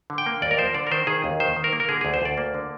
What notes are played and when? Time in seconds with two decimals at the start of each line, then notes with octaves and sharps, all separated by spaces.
0.10 D3
0.18 G5
0.26 A#3
0.42 D#2 D5
0.51 A#4
0.58 F3 C5
0.74 D3 D5
0.87 A#4
0.91 D#3 C5
1.07 D#3 G#4
1.24 D#2
1.40 D#3 C5
1.56 D#3
1.64 A#4
1.73 A#3
1.80 A#4
1.89 D3 G#4
2.01 D2 G#4
2.14 C5
2.22 D2 D5
2.37 A#3
2.54 D3